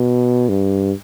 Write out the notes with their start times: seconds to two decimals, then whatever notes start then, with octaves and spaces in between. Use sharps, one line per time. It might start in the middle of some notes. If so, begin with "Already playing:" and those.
Already playing: B2
0.49 G2